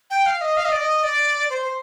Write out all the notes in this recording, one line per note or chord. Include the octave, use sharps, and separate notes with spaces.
G5
F5
D#5
F5
D#5
D5
D#5
D5
C5
C5